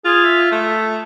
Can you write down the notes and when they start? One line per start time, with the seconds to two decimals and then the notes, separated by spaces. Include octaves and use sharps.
0.05 F4 G#4
0.24 E5
0.52 A3